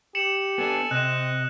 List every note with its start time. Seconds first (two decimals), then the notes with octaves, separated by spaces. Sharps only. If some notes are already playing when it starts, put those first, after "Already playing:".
0.15 G4 C#7 E7 F#7
0.58 B3 D4 A4 G#5
0.91 C3 C4 D#5 F#6 E7